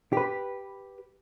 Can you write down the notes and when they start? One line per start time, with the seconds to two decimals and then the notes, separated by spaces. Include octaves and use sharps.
0.13 G4 B4